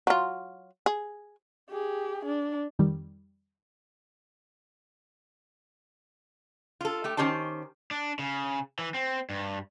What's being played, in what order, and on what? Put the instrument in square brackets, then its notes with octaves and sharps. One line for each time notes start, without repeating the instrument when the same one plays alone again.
[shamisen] F#3 F4
G#4
[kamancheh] G4 G#4
D4
[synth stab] F2 D#3 G3
[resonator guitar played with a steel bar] F4 A4
A3 G4
D#3 C#4 G4 C5 A5
[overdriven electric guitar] D4
C#3
E3
C4
G2